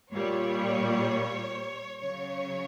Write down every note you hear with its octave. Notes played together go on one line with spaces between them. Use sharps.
A#2 G3 C#5
C#3 F#3 C#5